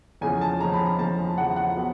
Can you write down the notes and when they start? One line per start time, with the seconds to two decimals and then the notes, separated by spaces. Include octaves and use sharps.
0.21 E2 C#3 F3 G#5
0.41 A5
0.60 E2 C#3 F3 A#5
0.74 B5
0.86 A#5
0.99 E2 C#3 F3 A5
1.37 E2 C#3 F3 F#5
1.56 F#5
1.76 F#3 B3